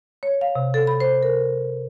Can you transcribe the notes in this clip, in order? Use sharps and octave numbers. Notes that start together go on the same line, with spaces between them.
C#5
F5
C3
A4
B5
C5
A#4